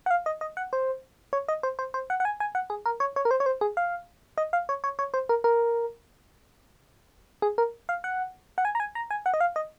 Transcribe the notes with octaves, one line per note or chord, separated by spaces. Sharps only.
F#5
F5
D#5
D#5
F#5
C5
C#5
D#5
C5
C5
C5
F#5
F#5
G#5
G#5
F#5
G#4
A#4
C#5
C#5
A#4
C5
C#5
C5
G#4
F5
D#5
F5
C#5
C#5
C#5
C5
A#4
A#4
G#4
A#4
F5
F#5
F#5
G#5
A#5
G#5
A#5
G#5
F#5
D#5
F5
D#5